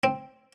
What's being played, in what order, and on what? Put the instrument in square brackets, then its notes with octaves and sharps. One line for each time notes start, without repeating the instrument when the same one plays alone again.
[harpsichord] C4